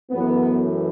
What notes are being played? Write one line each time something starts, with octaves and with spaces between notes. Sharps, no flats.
F#2 E3 A3 B3